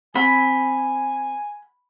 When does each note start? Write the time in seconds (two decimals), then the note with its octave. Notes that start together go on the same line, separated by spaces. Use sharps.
0.15 C4 G#5 B5